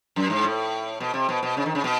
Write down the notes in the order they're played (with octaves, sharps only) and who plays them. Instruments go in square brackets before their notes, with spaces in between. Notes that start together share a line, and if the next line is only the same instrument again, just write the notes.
[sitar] F#2
G#2
A2
B2
C3
B2
B2
C#3
D#3
C#3
B2